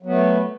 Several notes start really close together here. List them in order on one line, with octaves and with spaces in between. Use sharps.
F#3 B3 A3